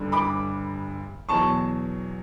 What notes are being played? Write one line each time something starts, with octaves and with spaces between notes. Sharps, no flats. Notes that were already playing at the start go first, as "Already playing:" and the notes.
Already playing: G1 G2 D3
B5 D6
E2 B2 F#3 A5 C#6